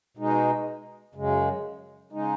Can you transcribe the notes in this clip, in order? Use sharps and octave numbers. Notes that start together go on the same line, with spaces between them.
B2 G#3 D#4
F#2 C#3 G#3
C#3 G#3 D#4